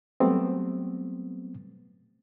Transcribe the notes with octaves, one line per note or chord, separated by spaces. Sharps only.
F#3 G3 A3 B3 C4